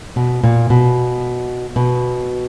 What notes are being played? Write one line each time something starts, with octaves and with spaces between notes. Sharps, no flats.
B2
A#2
B2
B2